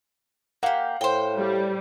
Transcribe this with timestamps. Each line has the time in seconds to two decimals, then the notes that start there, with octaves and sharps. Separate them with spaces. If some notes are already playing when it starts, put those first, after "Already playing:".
0.63 A#3 G4 F5 F#5
1.01 A2 C5 G5
1.37 G3